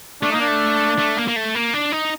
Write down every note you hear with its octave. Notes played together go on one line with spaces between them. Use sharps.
A3 D4
A#3 D#4
D4
A3
A3
A#3
A#3
A3
A#3
D4
D#4